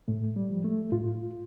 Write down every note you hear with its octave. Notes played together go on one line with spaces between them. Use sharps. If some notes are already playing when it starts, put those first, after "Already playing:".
A2 A3
G3
F3
A3
A2 F4